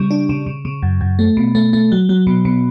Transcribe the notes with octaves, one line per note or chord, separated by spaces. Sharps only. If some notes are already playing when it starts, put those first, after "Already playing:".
Already playing: C#3 G3
D4
C#3
C#3
C#3
F#2
F#2
A3
B2
A3
A3
F#3
F#3
B2
B2